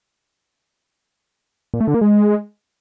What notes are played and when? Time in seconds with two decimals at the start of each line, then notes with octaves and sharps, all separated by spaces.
1.74 A#2
1.81 A3
1.88 D3
1.94 A#3
2.01 G#3